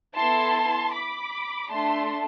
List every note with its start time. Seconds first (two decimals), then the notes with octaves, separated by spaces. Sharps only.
0.15 B3 E4 A4 A5 C6
0.92 B5 D6
1.70 A3 D4 A4 A5 C6